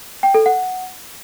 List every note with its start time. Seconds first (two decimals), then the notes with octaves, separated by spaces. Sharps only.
0.23 G5
0.34 A4
0.46 F#5